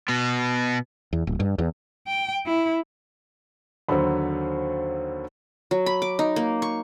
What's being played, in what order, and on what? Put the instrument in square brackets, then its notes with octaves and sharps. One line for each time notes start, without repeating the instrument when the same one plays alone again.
[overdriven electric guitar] B2 B3
[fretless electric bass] E2
D1
G2
E2
[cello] G5
E4
[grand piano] D#2 D3 F#3 [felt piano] C5 B5
[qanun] F#3
B5
D6
D#4
A#3
C#6